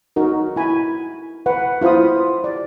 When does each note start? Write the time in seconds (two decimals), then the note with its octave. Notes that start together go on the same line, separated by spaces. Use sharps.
0.16 D#4 F#4 A#4
0.56 E4 G#5 B5
1.46 B4 F#5
1.81 E4 F4 C5 B5 D#6
2.44 D5